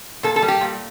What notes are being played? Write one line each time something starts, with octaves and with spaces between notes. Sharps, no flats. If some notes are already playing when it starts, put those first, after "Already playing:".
A#2 A4
A4
G3
G4
A#2